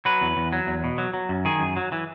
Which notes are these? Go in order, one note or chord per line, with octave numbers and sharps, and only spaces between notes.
F#3 B4
E2
E2
F#3
E2
B2
F#3
F#3
F#2
D#3 G#4
F#2
F#3
E3